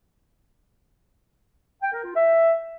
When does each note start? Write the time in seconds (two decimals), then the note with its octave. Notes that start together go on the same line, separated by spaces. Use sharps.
1.82 G5
1.93 A#4
2.04 F4
2.15 E5